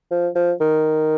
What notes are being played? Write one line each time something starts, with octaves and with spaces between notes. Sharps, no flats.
F3
F3
D#3